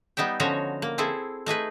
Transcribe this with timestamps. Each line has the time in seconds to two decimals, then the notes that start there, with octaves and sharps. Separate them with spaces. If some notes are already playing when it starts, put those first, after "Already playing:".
0.17 G3 B3 D#4 E5 G5
0.40 D3 F3 C#4 D#4 F#4 C#5
0.82 A#3
0.98 C4 E4 G#4 A4
1.46 A3 D#4 G#4 B4